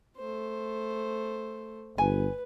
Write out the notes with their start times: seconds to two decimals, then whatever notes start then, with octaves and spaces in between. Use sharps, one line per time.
0.17 A3 C5
1.98 G1 B4 G#5